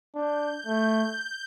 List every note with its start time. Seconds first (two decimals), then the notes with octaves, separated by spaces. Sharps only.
0.15 D4 G6
0.67 A3